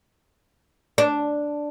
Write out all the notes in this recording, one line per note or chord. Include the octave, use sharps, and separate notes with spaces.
D4